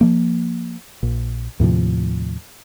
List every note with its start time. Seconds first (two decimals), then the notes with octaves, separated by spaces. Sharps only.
0.01 F3 A#3
1.03 A#1
1.60 D#2 A2 C3 F3